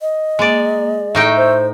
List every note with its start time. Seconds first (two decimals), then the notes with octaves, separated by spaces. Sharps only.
0.01 D#5
0.39 G#3 A#3 D5
1.15 A2 D#4 E5 G5 C#6 E6
1.37 C5